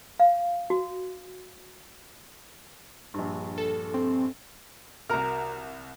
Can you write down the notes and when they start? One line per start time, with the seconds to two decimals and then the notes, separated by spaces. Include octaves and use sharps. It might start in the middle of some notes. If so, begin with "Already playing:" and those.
0.20 F5
0.70 F#4
3.14 A#1 G2
3.58 A4
3.94 C4
5.10 C2 F#4 A#4 A#5 F6